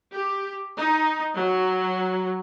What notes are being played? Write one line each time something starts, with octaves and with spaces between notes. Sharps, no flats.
G4
D#4
F#3